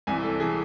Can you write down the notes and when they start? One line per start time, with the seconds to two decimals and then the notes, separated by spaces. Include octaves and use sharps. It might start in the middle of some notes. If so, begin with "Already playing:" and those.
0.07 C2 C3 E3 G#5
0.23 A4
0.40 C3 E3 G#4